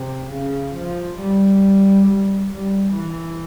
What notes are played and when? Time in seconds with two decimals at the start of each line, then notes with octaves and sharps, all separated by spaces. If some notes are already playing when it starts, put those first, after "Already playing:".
Already playing: C3
0.31 C#3
0.75 F3
1.19 G3
2.06 G3
2.49 G3
2.93 E3